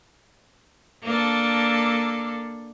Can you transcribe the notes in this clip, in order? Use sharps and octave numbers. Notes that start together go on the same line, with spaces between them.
A#3 D4 A4